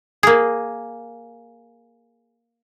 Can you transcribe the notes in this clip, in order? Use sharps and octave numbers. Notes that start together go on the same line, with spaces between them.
A#3 G#4